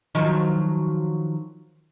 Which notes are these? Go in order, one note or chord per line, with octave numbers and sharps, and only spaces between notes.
D#3 F3 F#3